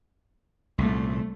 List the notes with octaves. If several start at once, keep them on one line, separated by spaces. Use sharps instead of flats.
C2 A#2 A3